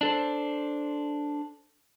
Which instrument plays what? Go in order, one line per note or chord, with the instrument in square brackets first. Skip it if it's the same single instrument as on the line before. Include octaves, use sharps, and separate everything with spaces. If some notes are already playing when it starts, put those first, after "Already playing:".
[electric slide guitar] D4 A4 C5